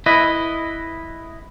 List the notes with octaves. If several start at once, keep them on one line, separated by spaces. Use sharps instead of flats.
E4 B4 D#5